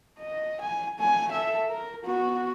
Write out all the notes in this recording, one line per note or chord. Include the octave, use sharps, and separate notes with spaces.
D#5
G#5
A3 G#5
A4 E5
A#4
B3 F#4